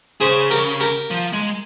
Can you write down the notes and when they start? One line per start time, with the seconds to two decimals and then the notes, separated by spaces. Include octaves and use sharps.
0.20 C#3 G#4 C5
0.50 G4 A#4
0.80 G4 A#4
1.11 F3
1.33 G#3